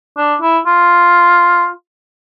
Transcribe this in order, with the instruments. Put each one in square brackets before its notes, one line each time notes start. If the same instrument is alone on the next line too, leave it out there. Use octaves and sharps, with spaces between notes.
[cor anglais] D4
E4
F4